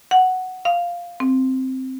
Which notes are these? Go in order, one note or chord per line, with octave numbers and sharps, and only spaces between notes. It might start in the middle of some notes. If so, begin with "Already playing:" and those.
F#5
F5
C4